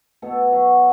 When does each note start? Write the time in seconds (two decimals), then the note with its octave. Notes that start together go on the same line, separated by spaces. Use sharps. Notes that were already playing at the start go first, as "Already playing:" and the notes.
0.22 B2 A4
0.52 F#3